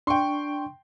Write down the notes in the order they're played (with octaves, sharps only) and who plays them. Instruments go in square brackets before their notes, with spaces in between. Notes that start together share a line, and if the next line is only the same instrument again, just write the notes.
[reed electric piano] D4 C#6 [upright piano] G5 C6